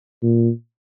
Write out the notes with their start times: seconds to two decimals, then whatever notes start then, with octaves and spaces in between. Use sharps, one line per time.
0.23 A#2